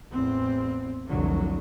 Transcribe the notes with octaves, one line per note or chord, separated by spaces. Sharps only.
A1 E2 C4
F1 C2 D3 F#3